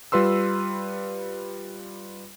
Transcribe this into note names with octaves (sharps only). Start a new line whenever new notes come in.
G3 F4 B4 C6 E6